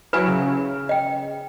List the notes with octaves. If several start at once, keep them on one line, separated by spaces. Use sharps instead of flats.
F#3 E4 B4 G#5
C#3
D#5 G5